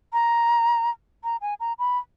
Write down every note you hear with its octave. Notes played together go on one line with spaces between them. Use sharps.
A#5
A#5
G#5
A#5
B5